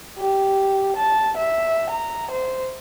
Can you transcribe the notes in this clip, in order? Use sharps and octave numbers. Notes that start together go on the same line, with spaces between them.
G4
A5
E5
A#5
C5